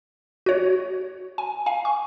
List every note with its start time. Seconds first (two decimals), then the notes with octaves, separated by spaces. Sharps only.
0.46 F#4 C#5
1.38 G#5
1.66 F5 G#5
1.85 C#6